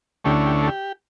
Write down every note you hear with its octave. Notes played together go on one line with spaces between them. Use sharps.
D2 D3 A3 C#4 E4 G4
G4
A4
G4